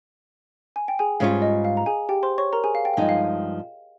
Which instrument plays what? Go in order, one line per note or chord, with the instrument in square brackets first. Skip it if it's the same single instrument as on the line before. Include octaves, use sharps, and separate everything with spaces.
[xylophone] G#5
G5
G#4 G#5
[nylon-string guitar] G#2 G3 C#4 F4 [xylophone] F5
[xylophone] D#5
F5
A#5
G#4 G#5
G4 G5
C5 C6
C#5 C#6
A#4 A#5
G#4 G#5
F5
G5
F5
[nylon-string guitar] G2 F3 G#3 D#4 [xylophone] D#5
[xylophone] F5